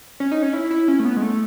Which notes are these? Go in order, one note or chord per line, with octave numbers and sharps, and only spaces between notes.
C#4
D#4
C#4
E4
E4
C#4
A3
B3
G#3
A3